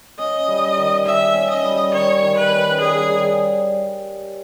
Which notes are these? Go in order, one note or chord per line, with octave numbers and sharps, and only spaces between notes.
C#4 D#5
G3
D#3
D#3 E5
C#4
D#5
G3
D#3 C#5
D#3
B4
C#4
G3 G#4
D#3